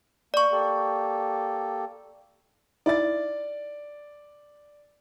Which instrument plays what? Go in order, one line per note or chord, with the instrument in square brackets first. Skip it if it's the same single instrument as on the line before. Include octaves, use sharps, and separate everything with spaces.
[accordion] A#3 [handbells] D5 C#6
[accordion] A#3 G4 A4
[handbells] D#4 E4 E5 [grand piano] D5 A6